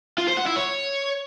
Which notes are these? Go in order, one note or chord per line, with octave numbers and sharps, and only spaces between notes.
F4
C5
F#5
E4
C#5